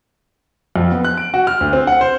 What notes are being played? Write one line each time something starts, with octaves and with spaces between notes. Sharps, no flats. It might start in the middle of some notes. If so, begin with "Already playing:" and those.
F2
B3
F#6
D7
F#4
F6
D2
C4
F#5
C5